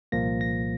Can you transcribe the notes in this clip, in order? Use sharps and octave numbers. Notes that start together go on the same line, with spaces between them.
C2 A#2 F3 A#3 A#6
A#6